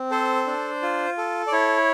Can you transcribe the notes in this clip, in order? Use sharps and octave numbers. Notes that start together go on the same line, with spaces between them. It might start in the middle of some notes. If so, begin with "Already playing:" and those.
Already playing: C4
A4 C5
D4
F4
A4
D5
E4 C#5